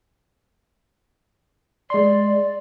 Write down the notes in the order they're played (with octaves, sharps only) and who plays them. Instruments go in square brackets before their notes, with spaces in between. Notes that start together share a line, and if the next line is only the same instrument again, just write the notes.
[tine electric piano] G#3 C6 [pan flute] D5